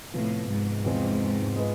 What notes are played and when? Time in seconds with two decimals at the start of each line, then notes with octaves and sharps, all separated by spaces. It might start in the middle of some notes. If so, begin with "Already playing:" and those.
0.13 A2 C3 F3 B3
0.49 G#2
0.85 E2 C3 F3 G#3 C4
1.56 G#3 B3 F4 B4